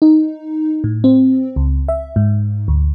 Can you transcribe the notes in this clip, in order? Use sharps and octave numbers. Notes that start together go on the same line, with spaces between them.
D#4
A2
C4
C#2
E5
G#2
D2